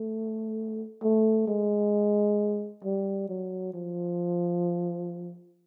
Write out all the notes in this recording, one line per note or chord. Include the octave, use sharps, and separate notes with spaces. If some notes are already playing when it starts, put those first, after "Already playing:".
Already playing: A3
A3
G#3
G3
F#3
F3